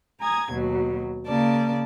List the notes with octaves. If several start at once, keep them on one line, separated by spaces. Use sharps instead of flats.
G#5 A#5 D#6 G#6
D#2 B2 F#3
C#3 A#3 D5 A5